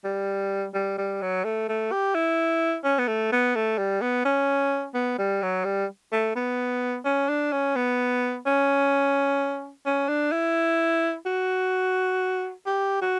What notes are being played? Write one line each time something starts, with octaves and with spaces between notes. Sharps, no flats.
G3
G3
G3
F#3
A3
A3
G4
E4
C#4
B3
A3
B3
A3
G3
B3
C#4
B3
G3
F#3
G3
A3
B3
C#4
D4
C#4
B3
C#4
C#4
D4
E4
F#4
G4
F#4